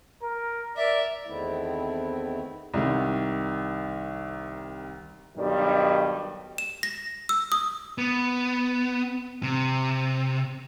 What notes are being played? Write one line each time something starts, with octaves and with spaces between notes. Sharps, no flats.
A#4
A#4 D5 E5
E2 D#3 A3 B3 C4 E4
C2 D#3
B1 G2 D#3 G3
E7
A#6
E6
D#6
B3
C3